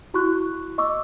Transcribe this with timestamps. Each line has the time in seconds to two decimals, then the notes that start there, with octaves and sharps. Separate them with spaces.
0.14 E4 F#4 C#6 F#6
0.78 D#5 C#6 D6 E6